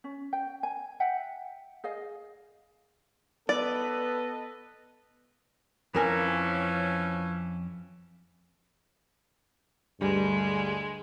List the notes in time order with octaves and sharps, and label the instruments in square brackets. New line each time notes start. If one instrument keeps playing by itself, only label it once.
[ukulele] C#4
G5
G#5
E5 F#5 G5
G#4 D#5 F5
[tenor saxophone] B3 [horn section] A4 B4 D#5 [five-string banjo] D5
[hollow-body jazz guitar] F2 A#4 G#5 [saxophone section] E3 F3 C#4
[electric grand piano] D2 G3 [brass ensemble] G2 [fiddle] G#3